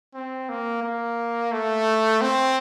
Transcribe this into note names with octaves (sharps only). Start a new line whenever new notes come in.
C4
A#3
A#3
A3
C4